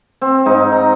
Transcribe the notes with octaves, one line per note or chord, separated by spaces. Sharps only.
C4
G#2 D#4
A#5